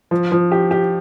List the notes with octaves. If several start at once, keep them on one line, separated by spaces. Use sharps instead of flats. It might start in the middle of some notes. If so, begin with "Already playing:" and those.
F3
F3
G4
G4